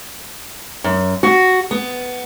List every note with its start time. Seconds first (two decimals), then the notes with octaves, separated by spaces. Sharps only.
0.84 F#2
1.23 F#4
1.71 B3